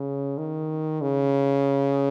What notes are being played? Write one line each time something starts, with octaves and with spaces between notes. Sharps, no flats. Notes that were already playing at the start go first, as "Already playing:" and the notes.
Already playing: C#3
D#3
C#3